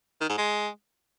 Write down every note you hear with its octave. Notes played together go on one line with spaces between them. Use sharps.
D#3
G#2
G#3